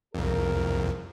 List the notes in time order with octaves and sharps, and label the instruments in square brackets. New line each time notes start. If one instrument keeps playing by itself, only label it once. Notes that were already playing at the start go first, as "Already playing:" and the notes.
[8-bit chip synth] C2 F2 [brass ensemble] G#4 A#4